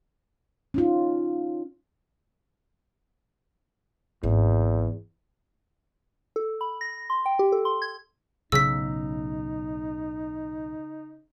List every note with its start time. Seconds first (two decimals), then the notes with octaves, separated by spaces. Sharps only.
0.74 C#4 D#4 F4
4.23 G#1 E2
6.36 A4
6.61 B5
6.81 A#6
7.10 C6
7.26 G5
7.39 G4
7.52 A4
7.65 C6
7.82 G#6
8.52 B1 A2 C#3 D#4 E6 B6